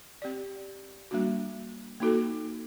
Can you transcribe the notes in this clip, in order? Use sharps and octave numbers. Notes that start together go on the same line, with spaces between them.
C4 G4 D5
G3 A#3 D4 F#4
A#3 D#4 F#4 A4